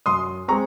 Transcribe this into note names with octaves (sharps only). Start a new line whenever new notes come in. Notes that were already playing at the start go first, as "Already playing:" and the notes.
F#2 C6 D#6
G#3 C4 A#5 C#6